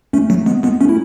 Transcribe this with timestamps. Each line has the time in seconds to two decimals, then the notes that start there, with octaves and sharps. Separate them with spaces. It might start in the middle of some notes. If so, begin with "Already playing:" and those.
0.13 A3 C#4
0.30 F#3 A3
0.46 G#3 B3
0.63 G#3 B3
0.81 A3 C#4
0.89 E4